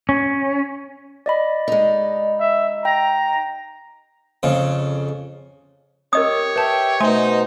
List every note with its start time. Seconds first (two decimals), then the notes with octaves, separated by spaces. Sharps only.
0.09 C#4
1.26 D5 D#5 B5
1.68 G#3 D#4
2.40 E5
2.85 G5 A#5
4.43 F2 C#3
6.13 G4 A#4 C#5 D#5 D#6
6.56 B4 E5 G5 A5
7.00 B2 A3 D#4 C5 G#5 C6